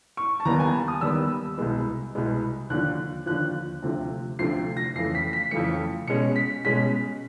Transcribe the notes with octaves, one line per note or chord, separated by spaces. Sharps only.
C#6
A5
D#2 D#3 G3 B3 A#5
G#5
A5
D#6
D#2 D#3 G3 B3 E6
C2 B2 G#3 B3
C2 B2 G#3 B3
D#2 D3 F3 F#6
D#2 D3 F3 F#6
D2 C3 F3 A3
D2 C3 F3 A3 C7
A#6
F2 C#3 E3 A3 C7
B6
B6
F2 C#3 E3 A3 C#7
B2 G#3 C#4 C#7
B6
B2 G#3 C#4 B6